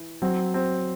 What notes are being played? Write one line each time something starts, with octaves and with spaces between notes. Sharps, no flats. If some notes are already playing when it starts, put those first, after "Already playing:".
Already playing: E3
F#3 C4
C4